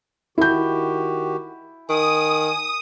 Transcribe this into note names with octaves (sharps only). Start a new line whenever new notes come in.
D#3 E4 F#4 G4 G6
D#3 G#5 D#6